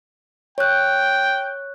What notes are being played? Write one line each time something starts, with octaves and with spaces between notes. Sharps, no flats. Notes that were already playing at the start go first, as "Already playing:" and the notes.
C#5 G5 F#6